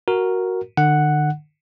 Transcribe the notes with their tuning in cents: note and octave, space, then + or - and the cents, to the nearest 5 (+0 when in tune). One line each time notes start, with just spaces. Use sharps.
F#4 +0 A#4 +0
D3 +45 F#5 +0